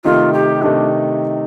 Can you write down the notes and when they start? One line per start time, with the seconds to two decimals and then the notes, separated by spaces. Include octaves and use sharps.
0.04 C3 D#3 A3 D#4 F4
0.33 G4
0.62 C3 D#3 A3 D4 D#4